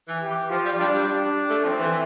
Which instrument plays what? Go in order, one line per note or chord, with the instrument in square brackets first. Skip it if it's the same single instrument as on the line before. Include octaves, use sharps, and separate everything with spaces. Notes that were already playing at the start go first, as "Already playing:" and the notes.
[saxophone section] E3
[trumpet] G4
[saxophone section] F3 [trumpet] F4
[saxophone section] G3
[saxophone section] G3 [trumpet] D4
[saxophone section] G3
[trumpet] D4
[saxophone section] A3
[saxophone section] F3 [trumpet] C4
[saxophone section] E3